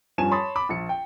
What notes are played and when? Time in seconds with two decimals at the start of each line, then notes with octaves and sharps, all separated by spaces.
0.18 G2 F3 C#4 G#5 E7
0.31 C#5 A5 B5 C6 D#6 A6
0.56 B5 D6
0.69 A#1 C#7
0.89 G5